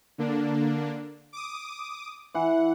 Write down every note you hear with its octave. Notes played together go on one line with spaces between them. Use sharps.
D3 A#3 D4
D6 D#6
E3 F#5